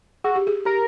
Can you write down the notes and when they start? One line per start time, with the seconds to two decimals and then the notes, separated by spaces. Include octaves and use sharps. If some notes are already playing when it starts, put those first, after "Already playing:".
0.24 F#4 G#4
0.35 G4
0.47 G#4
0.65 G4 A#4